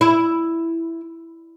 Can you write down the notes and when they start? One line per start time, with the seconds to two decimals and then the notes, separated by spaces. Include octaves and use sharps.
0.01 E4